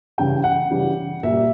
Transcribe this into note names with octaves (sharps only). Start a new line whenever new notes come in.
C#3 E3 G3 G5
F#5
C#3 E3 G3
A#2 G3 E5